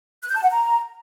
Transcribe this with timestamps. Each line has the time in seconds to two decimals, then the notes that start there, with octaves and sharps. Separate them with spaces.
0.22 F#6
0.29 G6
0.36 A5
0.43 F#5
0.50 A#5